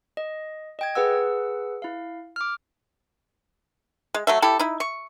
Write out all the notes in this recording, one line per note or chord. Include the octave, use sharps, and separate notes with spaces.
D#5
D#5 G5 G#6
G#4 B4 F#5 E6
E4 F5
D6 F6
G#3
F#3 A3 E5
E4 G4 A4
D#4 E4
C#6